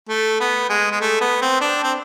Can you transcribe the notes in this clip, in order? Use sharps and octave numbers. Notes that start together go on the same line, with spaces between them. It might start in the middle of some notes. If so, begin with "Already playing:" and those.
A3
B3
G#3
G#3
A3
B3
C4
D4
C4